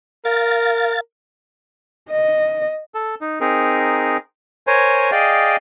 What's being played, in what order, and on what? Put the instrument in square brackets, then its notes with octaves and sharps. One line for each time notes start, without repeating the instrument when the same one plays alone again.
[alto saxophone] A#4 [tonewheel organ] F5 A6
[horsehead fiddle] D#5
[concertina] A4
D#4
C4 D#4 G#4 A#4
A#4 C5 C#5 G#5
G#4 D5 D#5 F5 G5